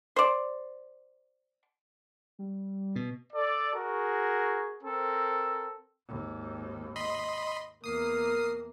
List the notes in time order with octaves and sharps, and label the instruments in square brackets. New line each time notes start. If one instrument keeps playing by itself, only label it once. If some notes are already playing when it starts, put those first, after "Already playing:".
[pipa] C5 D5
[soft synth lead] G3
[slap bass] B2
[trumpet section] A4 D5
F#4 G#4 A#4
C4 A4 A#4
[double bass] G#1 D#2
[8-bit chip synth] D#5 B5 C6
[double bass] E2 A#3 [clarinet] A#4 [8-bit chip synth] D#6 C7